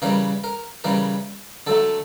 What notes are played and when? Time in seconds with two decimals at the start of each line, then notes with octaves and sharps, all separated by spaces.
0.02 C#3 E3 G3 A#4
0.44 A#4
0.84 C#3 E3 G3 A#4
1.67 D3 F#3 A3 A4